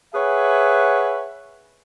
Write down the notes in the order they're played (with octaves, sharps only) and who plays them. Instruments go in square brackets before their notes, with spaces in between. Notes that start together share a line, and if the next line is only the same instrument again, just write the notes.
[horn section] G#4 B4 C#5 E5 F#5 G#5